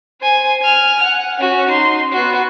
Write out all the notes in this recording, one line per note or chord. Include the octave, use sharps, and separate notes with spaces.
C5 G#5
G#5 F6
F#5
C#4 F#4
D#4 C6
B3 F#4